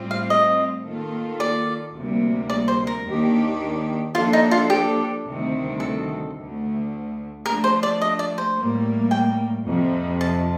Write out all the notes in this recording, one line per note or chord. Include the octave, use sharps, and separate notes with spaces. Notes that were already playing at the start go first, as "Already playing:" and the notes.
Already playing: A2 G3 C4 F4
F5
D#5
D#3 A#3 F4 A4
D5
D2 C3 G3 A#3
D5
C5
A#4
D#2 D#3 A#3 D4 G4
F3 A#3 D4 F4 A4
D#4
F4
G4
D2 C3 D#3 G3 C4
A4
D2 D3 A3
F3 A3 D4 A#4
C5
D5
D#5
D5
C5
A2 G3 A#3
G5
F2 C3 F3
A5